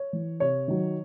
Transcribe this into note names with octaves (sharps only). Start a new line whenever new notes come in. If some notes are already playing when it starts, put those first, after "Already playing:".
Already playing: C#5
E3
C3 C#5
D#3 F#3